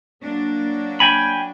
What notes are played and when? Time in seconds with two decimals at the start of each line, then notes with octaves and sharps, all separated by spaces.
0.22 F#3 A#3 D4
1.00 G5 G#5 B5